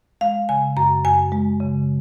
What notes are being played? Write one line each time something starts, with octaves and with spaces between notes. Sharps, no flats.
G#3 F5
C#3 G#5
F#2 A#5
F#2 G#5
G#3
C#3